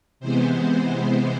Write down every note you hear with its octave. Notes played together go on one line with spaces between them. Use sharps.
C3 E3 G#3 B3 C5